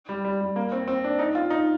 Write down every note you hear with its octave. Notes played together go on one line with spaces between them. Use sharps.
G3
G3
G3
A#3
C4
C4
D4
D#4
F4
D#4